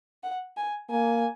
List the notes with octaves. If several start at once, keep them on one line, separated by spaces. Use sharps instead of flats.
F#5
G#5
A#3 G#5